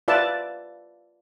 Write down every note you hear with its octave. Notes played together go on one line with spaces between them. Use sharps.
F4 B4 D5 E5 A5